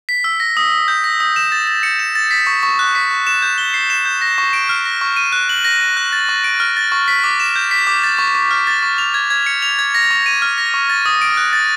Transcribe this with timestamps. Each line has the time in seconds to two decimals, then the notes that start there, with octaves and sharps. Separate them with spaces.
0.09 B6
0.24 E6
0.40 A#6
0.57 D#6
0.72 D#6
0.88 G6
1.04 A#6
1.20 D#6
1.36 E7
1.52 A6
1.67 A6
1.83 C#7
1.99 E7
2.15 A6
2.31 B6
2.47 C#6
2.63 C#6
2.79 F#6
2.95 B6
3.11 C#6
3.27 E7
3.42 G6
3.58 G7
3.74 C7
3.90 E7
4.05 G6
4.21 A#6
4.38 C#6
4.53 D7
4.69 F6
4.85 A#6
5.01 C#6
5.17 D#7
5.32 F#6
5.49 F#7
5.65 A#6
5.81 D#7
5.97 F#6
6.13 A6
6.29 C#6
6.44 D7
6.60 F6
6.77 A6
6.92 C#6
7.08 B6
7.24 D6
7.40 E7
7.56 G6
7.71 B6
7.87 D6
8.04 A6
8.19 C#6
8.35 C#6
8.51 F6
8.67 A6
8.83 C#6
8.98 F7
9.14 G#6
9.30 G#6
9.46 C#7
9.62 F7
9.79 G#6
9.95 A#6
10.11 C#6
10.26 D#7
10.42 F6
10.58 A#6
10.74 C#6
10.90 A6
11.06 D#6
11.22 D7
11.37 F#6
11.53 A6